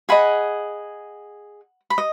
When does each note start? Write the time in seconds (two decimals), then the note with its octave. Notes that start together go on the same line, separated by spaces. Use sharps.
0.09 G#4 B4 D#5 F#5 B5
1.90 B5
1.98 D#5